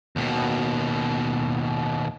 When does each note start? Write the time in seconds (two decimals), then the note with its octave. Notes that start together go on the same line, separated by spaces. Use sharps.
0.16 D#2 B2